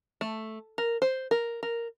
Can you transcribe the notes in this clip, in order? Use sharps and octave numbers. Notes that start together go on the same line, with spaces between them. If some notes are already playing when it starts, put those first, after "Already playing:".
A3
A#4
C5
A#4
A#4